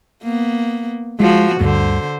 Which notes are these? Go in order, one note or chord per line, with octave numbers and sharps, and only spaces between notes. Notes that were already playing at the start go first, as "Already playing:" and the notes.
A#3 B3
F3 G#3 F#4
D2 G2 D3 C5